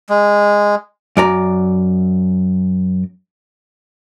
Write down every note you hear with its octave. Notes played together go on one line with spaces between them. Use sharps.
G#3
F#2 D5 A#5